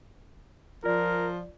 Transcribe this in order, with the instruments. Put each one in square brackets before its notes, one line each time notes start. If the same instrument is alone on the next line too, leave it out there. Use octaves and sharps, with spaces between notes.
[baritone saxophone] F3 [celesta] F4 D5 [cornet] A#4